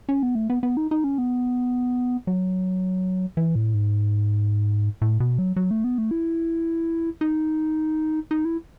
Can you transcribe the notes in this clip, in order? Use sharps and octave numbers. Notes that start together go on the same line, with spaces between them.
C#4
B3
A3
B3
B3
D#4
D#4
C#4
B3
F#3
E3
A2
G#2
A2
B2
F#3
F#3
A3
B3
A3
E4
D#4
D#4
E4